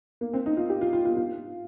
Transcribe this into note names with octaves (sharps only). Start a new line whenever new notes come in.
A#3
C4
D#4
F4
G4
F4
F4
F4
F4